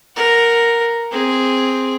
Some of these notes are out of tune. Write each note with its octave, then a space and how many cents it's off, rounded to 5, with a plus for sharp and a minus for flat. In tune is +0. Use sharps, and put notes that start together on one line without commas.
A#4 +0 F#5 +0
C4 +0 G#4 +0